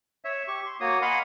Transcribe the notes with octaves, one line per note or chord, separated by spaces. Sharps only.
C#5 E5
G4 C#6
C6
A#3 F#4 C#5 D#6
D#5 F5 F#5 G#5 B5 C6